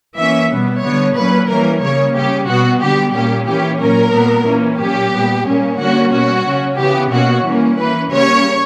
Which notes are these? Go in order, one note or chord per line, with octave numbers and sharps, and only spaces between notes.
E3 A#3 C#4 E5
B2 G3 B3
D3 G3 B3 C#5
A#2 F#3 A#3 C#4 B4
E3 G3 A#3 C#4 A#4
C#3 G3 A#3 C#4 C#5
C#3 G3 C#4 G4
B2 G3 B3 F#4
D3 G3 B3 G4
A#2 G3 A#3 C#4 G4
E3 A#3 C#4 G4
A#2 F#3 C#4 A#4
A#2 G3 B3
E3 A#3 C#4
A#2 F#3 C#4 G4
A#2 G3 B3
A#2 G3 A#3 C#4
D3 G3 A#3 C#4 F#4
B2 G3 C#4 F#4
C#3 F#3 C#4
C#3 E3 B3 G4
B2 A#3 C#4 F#4
E3 G3 A#3 C#4
E3 A#3 C#4 B4
C#3 G3 A#3 C#4 C#5